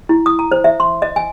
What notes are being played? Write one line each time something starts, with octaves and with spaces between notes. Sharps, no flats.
E4
D#6
A#5
C5
E5
C6
D#5
G#5